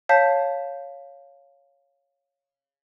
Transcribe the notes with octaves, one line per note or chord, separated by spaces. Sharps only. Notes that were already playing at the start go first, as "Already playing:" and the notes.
C#5 F5 A5 G6 B6